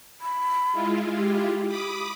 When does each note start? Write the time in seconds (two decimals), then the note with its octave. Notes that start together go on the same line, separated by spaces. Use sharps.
0.21 B5
0.73 G#3 E4 F4
1.16 G4
1.68 B5 D6 D#6